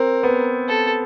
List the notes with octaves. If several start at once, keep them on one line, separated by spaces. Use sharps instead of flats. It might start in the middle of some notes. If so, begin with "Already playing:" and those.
Already playing: C4 A#4
B3
A4